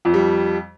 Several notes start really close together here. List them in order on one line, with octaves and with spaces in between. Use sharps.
F2 F3 G3